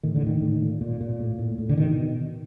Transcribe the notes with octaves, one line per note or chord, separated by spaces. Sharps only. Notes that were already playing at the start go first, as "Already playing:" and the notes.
A2 D#3
D3
A2 D#3
A2
A#2
A#2
A#2
A2
A2
A2
D3
B2 D#3
B2